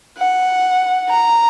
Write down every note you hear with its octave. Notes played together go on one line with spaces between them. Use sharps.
F#5
A#5